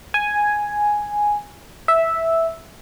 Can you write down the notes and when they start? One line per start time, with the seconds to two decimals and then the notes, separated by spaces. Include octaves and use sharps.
0.14 G#5
1.88 E5